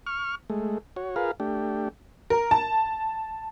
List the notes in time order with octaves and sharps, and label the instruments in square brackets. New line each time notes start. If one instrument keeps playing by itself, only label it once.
[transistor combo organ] C#6 F6
G#3 A3
F#4 C#5
F4 G#4 A#4 B4 F5
A3 D4 G4
[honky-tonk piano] A#4
A5